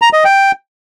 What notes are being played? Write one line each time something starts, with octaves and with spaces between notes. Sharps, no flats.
A#5
D#5
G5